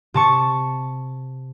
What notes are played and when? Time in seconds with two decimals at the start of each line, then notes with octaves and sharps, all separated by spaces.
0.14 C3 A5 C#6